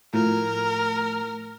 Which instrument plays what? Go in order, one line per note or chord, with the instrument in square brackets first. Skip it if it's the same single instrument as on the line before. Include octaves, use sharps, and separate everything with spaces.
[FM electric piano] A2 F3 [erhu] A#4